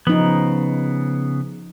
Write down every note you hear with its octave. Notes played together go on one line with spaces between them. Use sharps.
C#3 F3 B3 D#4